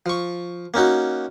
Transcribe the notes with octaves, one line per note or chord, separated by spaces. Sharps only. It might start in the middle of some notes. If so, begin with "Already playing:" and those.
F3 C#6
A#3 C#4 D#4 F#4